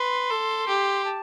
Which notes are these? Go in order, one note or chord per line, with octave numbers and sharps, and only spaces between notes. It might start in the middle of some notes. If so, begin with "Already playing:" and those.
Already playing: B4 C6
A4
G4
A5